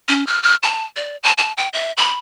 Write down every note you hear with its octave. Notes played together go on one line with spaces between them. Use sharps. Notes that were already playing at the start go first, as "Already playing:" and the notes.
C#4
F6
F6
A5
D5
A5
A5
G5
E5
B5